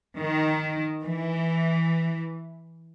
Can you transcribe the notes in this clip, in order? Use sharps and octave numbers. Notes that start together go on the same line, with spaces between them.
D#3
E3